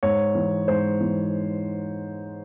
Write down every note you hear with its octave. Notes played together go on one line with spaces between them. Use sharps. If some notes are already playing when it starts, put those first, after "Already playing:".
G#2 C#5
E3
G#2 C5
E3